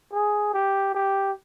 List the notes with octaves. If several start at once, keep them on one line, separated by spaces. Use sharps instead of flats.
G#4
G4
G4